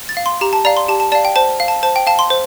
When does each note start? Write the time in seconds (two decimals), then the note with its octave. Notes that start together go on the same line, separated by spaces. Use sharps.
0.09 A6
0.17 F5
0.26 C6
0.41 G4 A#5
0.53 A5
0.65 D5 F5 A#5
0.77 C6
0.88 G4 A5
1.00 A5
1.12 D5 F5 A5
1.25 G5
1.36 C5 A5
1.60 F5
1.68 A5
1.83 C5 A5
1.96 G5
2.07 F5 A5
2.19 C6
2.30 C5